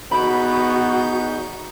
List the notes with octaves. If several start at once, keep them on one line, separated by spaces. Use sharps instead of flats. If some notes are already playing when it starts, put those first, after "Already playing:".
E2 B3 D#4 F#4 B5 G6